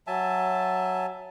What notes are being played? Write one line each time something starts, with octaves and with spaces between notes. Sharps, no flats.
F#3 E5 G#5 A5